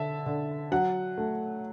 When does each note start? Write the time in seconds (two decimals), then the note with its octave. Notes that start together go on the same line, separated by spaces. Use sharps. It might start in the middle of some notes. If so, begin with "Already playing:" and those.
Already playing: D3 E5 A5
0.26 D3
0.72 F#3 F#5
1.18 A3